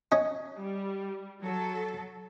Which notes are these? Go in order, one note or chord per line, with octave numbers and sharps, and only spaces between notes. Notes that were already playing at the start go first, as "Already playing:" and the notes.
C#4 D#5
G3
F#3 A4